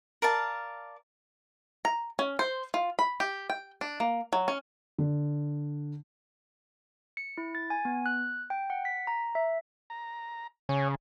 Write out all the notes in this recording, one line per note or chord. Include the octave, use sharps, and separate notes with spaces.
A#4 D5 F5 A5
A#5
C#4
C5
F4
B5
G4
G5
D4
A#3
F#3
C#4
D3
C#7
E4
A6
G#5
B3
F#6
G5
F#5
B6
A#5
E5
A#5
C#3 C#5 G#5